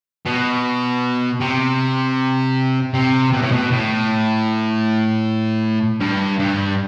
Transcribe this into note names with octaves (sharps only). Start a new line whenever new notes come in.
B2
C3
C3
B2
A2
B2
A2
G2
G2